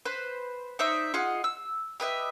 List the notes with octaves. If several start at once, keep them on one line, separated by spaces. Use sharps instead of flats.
B4 C5
D#4 C5 D5 E5
F4 G#4 D#5 F#5
E6
G4 B4 D#5 E5